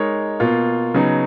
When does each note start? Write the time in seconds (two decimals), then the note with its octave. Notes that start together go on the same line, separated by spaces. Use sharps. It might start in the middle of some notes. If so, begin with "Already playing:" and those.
Already playing: G#3 D#4 A#4 C#5
0.40 B2 A#3 F4
0.94 C#3 F#3 B3 D#4